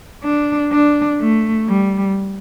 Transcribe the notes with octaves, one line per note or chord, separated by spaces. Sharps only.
D4
D4
A3
G3